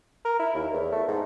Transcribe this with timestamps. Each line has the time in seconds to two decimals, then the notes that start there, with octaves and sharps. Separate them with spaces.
0.25 A#4
0.39 E4
0.54 D#2
0.73 E2
0.92 A3
1.08 G#2